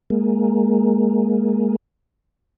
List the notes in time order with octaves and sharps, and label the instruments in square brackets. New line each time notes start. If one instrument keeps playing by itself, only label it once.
[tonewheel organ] G#3 A#3